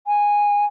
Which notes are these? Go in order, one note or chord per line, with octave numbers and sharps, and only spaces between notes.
G#5